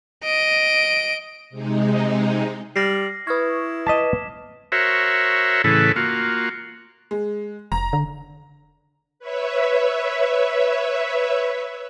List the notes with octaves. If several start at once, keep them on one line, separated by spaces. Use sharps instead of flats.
D#5 D7
C3 G#3 D#4
G3 F6 A#6 C7
E4 B4 C#6 D#6 F6 G#6
D#5 A5 D6 B6 E7
F#4 A#4 C5 C#5 E5
A2 C#3 E3 A4 B4
A#3 F4 F#4
G#3
F1 A#5
D3
B4 C#5 E5